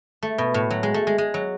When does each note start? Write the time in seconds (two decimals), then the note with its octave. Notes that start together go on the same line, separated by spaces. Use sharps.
0.23 A3
0.38 B2
0.54 A2
0.70 F#3
0.83 G#3
0.94 A3
1.07 G#3
1.18 G#3
1.34 F#3